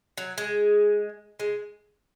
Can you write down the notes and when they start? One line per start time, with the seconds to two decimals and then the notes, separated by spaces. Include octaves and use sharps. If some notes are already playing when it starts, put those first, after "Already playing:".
0.18 F#3
0.38 G#3
1.40 G#3